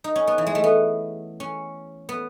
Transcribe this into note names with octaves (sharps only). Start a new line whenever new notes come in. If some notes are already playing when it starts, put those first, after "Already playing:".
D#4
C#4
B3
E3
G#3
A3
B3
C#4
B3